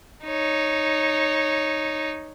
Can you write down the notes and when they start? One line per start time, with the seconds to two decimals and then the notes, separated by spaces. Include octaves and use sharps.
0.25 D#4 C#5